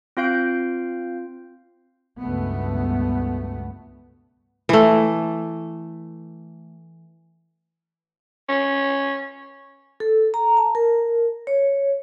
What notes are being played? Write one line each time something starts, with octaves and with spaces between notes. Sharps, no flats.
C4 F4 F5 G6 D7
C#2 G2 B2 A3 B3
E3 A3
C#4
A4
A#5
A5
A#4
C#5